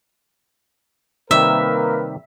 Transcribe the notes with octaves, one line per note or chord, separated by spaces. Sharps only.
C3 D#3 G3 A#3 A#4 B4 E5